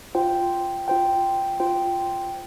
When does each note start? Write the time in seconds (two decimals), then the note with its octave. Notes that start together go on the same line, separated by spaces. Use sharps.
0.15 F4 C5 G5
0.88 F4 C5 G5
1.60 F4 C5 G5